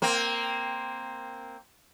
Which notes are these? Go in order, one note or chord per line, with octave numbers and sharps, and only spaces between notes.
A#3 C4